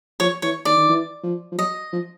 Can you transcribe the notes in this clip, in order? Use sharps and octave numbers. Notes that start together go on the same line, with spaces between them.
F3 C#5
E3 C#5
D#3 D5
D#3
E3
F3
F3
F#3 D#5
F3